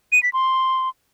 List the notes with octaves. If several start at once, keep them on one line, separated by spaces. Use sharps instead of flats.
D#7
B6
C6